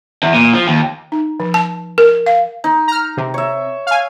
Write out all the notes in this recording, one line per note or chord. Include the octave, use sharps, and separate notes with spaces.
E2
A#2
F3
D#2
D#4
F3
A5
A#4
F5
D#4
A#5 F6
C3
C#5 E5
F5 G#5